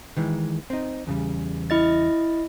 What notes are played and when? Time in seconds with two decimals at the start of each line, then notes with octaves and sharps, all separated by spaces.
0.17 D#3 E3 G#3
0.70 C4 D#4
1.07 E2 C#3 G3
1.70 E4 D#5 A6